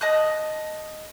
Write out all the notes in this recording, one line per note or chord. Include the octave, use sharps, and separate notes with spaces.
D#5 A5 D#6 F#6